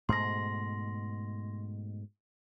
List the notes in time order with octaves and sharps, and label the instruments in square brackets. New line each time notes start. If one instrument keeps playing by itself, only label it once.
[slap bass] G#2 B2 A3 [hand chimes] C6 A#6